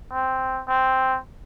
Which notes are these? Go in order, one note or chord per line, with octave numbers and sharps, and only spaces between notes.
C4
C4